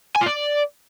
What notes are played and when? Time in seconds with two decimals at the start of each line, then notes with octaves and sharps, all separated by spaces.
0.16 G#5
0.21 F4
0.26 D5